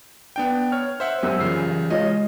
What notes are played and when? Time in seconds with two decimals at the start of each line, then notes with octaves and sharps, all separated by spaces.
0.36 B3 D4 G5
0.72 C#5 F6
1.00 C5 E5 F#5
1.23 F#2 G4 C#5 G#5 E6
1.40 C#3 E3 G3 F4 C7
1.90 G#3 F4 C#5 D#5